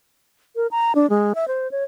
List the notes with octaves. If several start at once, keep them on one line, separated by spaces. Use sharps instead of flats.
A#4
A#5
D4
G#3
E5
C5
C#5